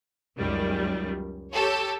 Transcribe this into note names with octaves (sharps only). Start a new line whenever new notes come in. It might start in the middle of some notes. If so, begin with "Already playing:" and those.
C#2 F#2 D#3 G3
G4 A4 C#5